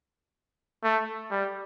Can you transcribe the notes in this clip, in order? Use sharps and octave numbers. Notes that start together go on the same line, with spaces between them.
A3
G3